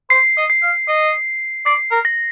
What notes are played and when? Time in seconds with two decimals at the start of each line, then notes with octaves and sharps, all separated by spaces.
0.10 C5 C7
0.37 D#5
0.50 C7
0.63 F5
0.88 D#5
1.66 D5 C7
1.91 A#4
2.05 A#6